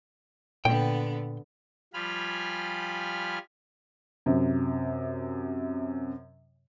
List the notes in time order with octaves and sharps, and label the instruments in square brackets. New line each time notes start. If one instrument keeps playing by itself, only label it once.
[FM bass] A#2 [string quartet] D3 B3 [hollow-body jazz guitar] G5
[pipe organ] F3 G3 F4 G#5 B5 F6
[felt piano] F#2 C3